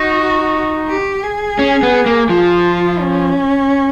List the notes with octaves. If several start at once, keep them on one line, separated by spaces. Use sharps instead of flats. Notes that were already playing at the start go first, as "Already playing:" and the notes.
Already playing: D#4 F#4
G4
G#4
C#4
B3
A#3
F3 F4
C#4